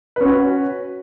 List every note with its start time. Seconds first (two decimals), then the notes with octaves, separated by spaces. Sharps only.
0.16 B4
0.21 C#4
0.25 F#4